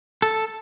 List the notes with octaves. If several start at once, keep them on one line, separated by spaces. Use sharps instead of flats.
A4